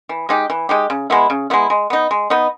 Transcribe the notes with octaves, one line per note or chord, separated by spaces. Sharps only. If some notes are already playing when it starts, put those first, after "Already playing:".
E3
G#3 D#4 G4
E3
G#3 D#4 G4
C#3
G#3 B3 E4
C#3
G#3 B3 E4
G#3
B3 D#4
G#3
B3 D#4